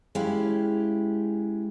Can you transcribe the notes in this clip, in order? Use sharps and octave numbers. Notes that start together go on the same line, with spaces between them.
G#3 C#4 E4 G4 F5